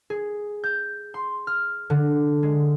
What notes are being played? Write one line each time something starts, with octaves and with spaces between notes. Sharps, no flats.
G#4
G6
C6
F6
D3
G#3